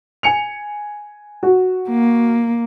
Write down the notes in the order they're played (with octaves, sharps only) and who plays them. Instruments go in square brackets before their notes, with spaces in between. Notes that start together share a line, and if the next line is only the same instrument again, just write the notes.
[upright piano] G#5 C#7 F7
F#4
[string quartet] A#3